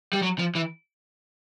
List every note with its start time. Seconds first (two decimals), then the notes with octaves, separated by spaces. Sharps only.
0.13 G3
0.23 F#3
0.39 F3
0.55 E3